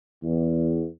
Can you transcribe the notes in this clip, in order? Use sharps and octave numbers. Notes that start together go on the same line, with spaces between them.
E2